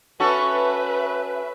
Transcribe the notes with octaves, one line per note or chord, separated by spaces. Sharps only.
C#4 F#4 A4 B4 E5